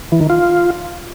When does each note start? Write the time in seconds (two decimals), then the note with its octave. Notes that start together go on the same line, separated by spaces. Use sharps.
0.12 E3
0.21 D#3
0.30 F4